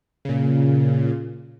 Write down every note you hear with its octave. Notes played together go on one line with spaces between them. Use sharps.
A#2 C#3